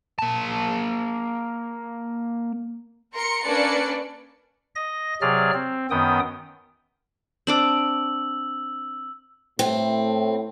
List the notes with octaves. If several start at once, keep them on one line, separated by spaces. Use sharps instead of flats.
A#3 A5
A#4 A#5 C6 C#7
A#3 C#4 D4 B4 D5 C#7
D#5 A#6
C3 F#3 G#4 D5 F6
C4
F#2 D#3 B3 G5 D#6
C4 D4 D6 E6 F#7
A2 C4